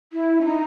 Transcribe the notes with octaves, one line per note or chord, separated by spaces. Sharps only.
E4
C#4
D#4